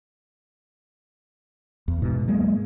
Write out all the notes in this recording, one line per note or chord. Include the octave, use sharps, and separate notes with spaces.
E2
G#2 B2
F#3 G#3 A#3